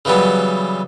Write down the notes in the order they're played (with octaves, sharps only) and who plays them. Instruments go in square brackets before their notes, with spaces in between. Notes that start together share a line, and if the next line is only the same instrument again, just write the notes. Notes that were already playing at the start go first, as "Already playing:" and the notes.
[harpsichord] C#3 E3 F#3 G3 B3